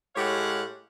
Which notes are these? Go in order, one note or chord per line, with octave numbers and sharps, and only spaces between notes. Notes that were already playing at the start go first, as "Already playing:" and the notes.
A2 G#3 G4 C#5 F5 F#5